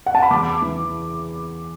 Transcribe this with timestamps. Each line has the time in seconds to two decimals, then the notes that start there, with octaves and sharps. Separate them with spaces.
0.06 F#5
0.15 A5
0.22 B5
0.31 E2 D6
0.62 E3